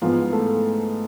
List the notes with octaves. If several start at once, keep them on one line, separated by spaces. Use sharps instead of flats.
G#2 E3 F3 G#3 B3 F4
A3 A4